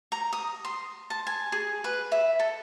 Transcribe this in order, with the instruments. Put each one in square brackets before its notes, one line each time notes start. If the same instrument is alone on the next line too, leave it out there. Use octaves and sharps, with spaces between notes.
[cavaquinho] A#5
D#6
C6
A5
G#5
G#4
B4
E5
A4